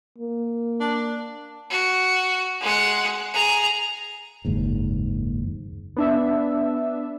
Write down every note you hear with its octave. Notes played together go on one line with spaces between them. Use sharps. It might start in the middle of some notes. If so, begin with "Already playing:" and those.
A#3
D4
F#4
G#3 F#5
G#4 A#5
F#1 D#2 G#2
B3 D4 E5